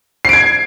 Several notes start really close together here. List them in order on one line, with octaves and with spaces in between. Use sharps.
C7 D7 G#6